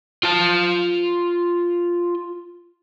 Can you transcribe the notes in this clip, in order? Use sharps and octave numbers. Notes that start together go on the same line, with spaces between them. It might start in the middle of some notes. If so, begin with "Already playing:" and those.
F4 A5